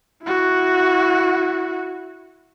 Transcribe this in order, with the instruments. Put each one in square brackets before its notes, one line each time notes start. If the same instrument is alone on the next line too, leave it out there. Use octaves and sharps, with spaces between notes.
[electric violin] E4 F#4